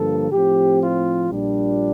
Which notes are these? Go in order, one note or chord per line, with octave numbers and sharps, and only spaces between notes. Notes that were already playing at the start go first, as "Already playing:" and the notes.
Already playing: G2 D3 F3 A#3 A4
A2 F3 C4 G4
F4
A#1 A#2 G3 D4